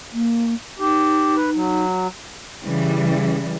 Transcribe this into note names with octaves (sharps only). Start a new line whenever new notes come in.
A#3
D#4 G4
B4
F#3
C#3 E3 G3